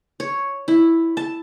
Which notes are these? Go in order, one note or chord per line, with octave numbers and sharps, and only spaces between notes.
C#5
E4
A5